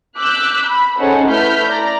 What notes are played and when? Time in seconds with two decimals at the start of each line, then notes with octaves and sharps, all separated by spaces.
0.18 D6 E6 F#6 G6 B6
0.66 B5
0.99 C#4 D#4 G#4 A4 C5 F#5
1.27 A3 E4 B4 F6 G6 B6
1.69 D5 A#5 A#6